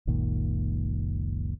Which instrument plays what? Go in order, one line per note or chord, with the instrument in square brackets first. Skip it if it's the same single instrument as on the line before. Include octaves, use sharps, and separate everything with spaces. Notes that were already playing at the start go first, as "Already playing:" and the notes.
[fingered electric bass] F#1 C#2 A#2 D#3